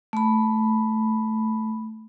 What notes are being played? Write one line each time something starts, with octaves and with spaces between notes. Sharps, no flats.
A3 B5